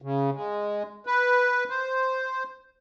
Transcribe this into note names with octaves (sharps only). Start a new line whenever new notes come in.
C#3
G#3
B4
C5